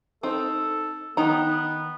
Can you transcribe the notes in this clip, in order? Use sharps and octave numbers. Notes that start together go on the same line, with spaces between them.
C4 D#4 A4
D#3 B3 D#4 A#5